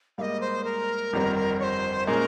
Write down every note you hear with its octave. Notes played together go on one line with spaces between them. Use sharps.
G#2 G3 A#3 D#5 F5
C5
A#4
G1 F2 D#3 G3 C4
C#5
C5
A#2 G#3 C#4 A#4